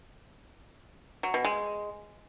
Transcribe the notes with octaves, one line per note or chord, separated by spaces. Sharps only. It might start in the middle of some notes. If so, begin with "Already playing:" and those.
F#3
B2
G#3